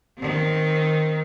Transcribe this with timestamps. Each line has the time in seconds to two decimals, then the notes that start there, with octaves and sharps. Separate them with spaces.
0.17 D#3 C4